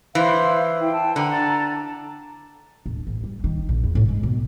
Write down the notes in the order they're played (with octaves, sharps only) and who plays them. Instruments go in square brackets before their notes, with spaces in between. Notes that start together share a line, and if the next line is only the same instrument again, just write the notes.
[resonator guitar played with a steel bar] E3 [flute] C5 [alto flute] F5
[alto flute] E4 [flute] G5
[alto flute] A5
[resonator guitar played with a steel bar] D3 [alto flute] A#5
[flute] A5
[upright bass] D1
A1
G3
D#3
A#1
E2
A2
G#2
B2